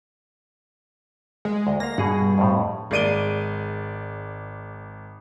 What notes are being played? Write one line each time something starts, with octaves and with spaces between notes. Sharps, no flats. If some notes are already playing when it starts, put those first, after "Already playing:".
G#3
D2
A#3 F5 A#6
G2 B2 G#4 F#5
F2 A2
G#1 G#3 D5 D7 D#7 G7